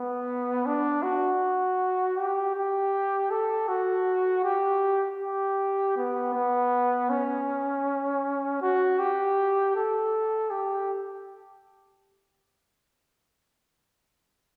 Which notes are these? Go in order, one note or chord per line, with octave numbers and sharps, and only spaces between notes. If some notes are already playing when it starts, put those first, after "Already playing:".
Already playing: B3
D4
F#4
G4
G4
A4
F#4
G4
G4
B3
B3
C#4
F#4
G4
A4
G4